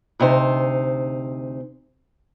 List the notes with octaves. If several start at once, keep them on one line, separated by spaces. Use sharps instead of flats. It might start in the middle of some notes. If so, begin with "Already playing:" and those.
D2 C3 D#4 C5